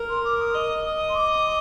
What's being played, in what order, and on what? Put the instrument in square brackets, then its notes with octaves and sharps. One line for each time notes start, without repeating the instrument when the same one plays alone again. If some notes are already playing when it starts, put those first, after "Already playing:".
Already playing: [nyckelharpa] A#4
[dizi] C6
D6
D#6
[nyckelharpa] D#5
[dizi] C6
D6